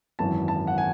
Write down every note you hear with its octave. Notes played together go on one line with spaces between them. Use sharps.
G#1 F#2 E3 A5
A5
F#5
G#5